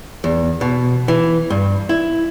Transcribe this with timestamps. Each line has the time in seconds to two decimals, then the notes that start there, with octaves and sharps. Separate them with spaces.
0.24 E2
0.61 B2
1.08 E3
1.50 G2
1.89 E4